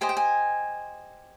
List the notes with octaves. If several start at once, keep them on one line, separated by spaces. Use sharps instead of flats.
G4 C5 D#5 G#5
G5
G#5